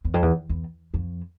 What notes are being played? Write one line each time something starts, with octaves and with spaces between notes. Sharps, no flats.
E2
F2
E2
E2
F2